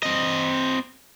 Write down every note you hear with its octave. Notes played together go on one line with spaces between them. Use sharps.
C4 D#5